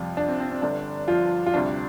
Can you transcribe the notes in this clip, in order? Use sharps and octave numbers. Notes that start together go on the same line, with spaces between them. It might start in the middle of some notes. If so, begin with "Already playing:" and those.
Already playing: F2 C3 F3 G3 F4
D4
C4
C4
C4
G1 G2 D3 G3 D4
F3 F4
F4
D2 C3 G3 D4